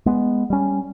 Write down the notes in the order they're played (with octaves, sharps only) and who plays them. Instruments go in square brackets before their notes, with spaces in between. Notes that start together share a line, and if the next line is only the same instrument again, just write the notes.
[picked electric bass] G#3 B3
G3 C#4